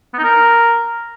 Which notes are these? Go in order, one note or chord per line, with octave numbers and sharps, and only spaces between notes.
B3
D#4
A#4